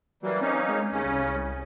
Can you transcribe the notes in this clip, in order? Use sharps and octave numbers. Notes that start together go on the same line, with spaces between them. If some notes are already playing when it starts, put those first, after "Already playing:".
E3 F#3 G3 A#3
A#3 C4 C#4 D#4
G#3
D#2 C#3 C#4
C2